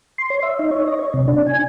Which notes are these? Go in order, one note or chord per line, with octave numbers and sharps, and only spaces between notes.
C6
C#5
E5
D#4
C#5
D#5
C#5
C3
D4
G#5